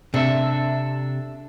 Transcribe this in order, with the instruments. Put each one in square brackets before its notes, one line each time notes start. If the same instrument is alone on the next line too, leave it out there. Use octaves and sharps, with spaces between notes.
[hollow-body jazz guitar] C3 [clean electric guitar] D4 A4 E5